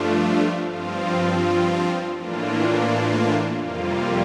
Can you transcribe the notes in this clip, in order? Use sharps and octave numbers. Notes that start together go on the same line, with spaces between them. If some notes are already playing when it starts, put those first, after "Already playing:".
Already playing: G2 F3 A3 D4 F4
G2 F3 C4 F4
A2 E3 A#3 D4 F4
F2 C3 G3 A#3 F4